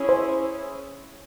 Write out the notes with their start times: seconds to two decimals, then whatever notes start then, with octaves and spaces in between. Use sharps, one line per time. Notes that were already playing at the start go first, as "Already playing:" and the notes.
Already playing: C#4 E4 G#4
0.09 C5